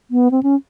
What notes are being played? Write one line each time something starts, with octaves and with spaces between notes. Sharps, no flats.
B3
C4
C#4